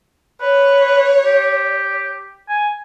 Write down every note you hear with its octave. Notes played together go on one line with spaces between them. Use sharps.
B4 C#5
G4
G#5